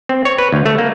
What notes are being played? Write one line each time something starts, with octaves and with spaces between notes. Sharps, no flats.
C4
C#5
B4
D2
A3
A#3